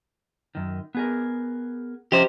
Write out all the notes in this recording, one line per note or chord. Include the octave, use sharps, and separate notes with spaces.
F#2 D#3
B3 G#4 A#4
F3 C#4 G4 C5 D#5